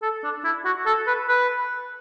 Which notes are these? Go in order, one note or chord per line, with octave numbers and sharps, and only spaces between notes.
A4
D4
E4
F#4
A4
B4
B4